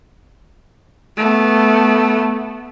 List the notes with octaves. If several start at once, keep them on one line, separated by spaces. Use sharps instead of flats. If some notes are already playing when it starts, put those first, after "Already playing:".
A3 B3